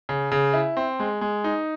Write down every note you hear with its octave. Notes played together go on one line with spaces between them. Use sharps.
C#3
C#3
E4
C4
G#3
G#3
D#4